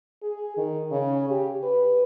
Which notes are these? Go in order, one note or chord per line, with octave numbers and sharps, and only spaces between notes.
G#4
D#3
C#3
G4
B4